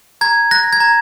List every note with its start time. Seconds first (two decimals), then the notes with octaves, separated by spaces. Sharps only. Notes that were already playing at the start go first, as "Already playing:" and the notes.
0.21 A#5 G#6
0.51 F#6 A#6
0.73 G#6
0.80 A#5